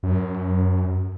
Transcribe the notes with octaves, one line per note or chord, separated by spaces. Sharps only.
F#2